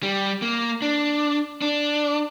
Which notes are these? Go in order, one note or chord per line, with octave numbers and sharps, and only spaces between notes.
G3
A#3
D4
D4